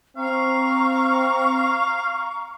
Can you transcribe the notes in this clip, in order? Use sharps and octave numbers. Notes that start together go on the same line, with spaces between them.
C4 F5 A#5 C#6